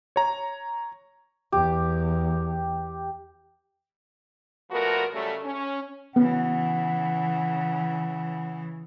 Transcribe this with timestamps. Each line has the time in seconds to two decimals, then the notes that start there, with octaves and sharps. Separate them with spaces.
0.16 C#5 A#5
1.52 E2 G4
4.70 A#2 F3 A3 B3 F#4 A#4
5.13 C#3 F#3 G3 A3
5.43 C#4
6.16 C#3 E3 B3 F#5